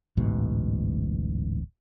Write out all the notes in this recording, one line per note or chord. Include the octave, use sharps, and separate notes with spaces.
D1 A1 G#2 B2